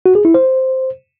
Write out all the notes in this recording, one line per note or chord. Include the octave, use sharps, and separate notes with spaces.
F#4
G#4
E4
C5